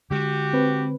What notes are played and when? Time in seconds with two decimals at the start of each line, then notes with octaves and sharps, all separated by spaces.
0.11 D3 G#3 F#4 G4
0.53 C4 B4